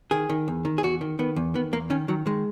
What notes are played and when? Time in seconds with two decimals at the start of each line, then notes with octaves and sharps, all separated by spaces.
0.11 D#3 G#4
0.30 D#3
0.48 E2
0.65 D#3
0.78 G#4
0.83 E2 F#4
1.01 D#3
1.19 D#3 B3
1.36 E2
1.54 D#3 B3
1.73 E2 A#3
1.90 D#3 C#4
2.08 D#3 F#3
2.26 D#3 G#3